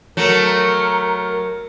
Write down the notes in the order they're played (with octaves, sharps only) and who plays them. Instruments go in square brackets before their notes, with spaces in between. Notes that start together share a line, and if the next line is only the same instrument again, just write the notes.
[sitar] F#3 A3 [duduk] A#4